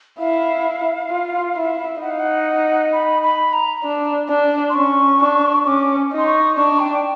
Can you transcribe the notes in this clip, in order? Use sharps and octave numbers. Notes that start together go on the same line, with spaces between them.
E4 F5
F4
E4
D#4 F#5
F5
F#5
B5
B5
A#5
D4
D4
C6
C#4 C#6
D4
C#4 D6
D#4
C6
C#6
D4 C#6
G5
G5